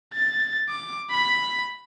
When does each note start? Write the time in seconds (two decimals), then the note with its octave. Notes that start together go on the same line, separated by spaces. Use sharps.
0.14 A6
0.69 D6
1.10 B5 B6